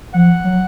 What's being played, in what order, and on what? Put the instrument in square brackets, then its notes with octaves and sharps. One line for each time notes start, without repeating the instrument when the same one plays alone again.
[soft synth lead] F3 [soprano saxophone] F#5
[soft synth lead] F#3